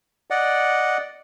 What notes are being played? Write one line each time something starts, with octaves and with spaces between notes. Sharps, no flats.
D5 D#5 F#5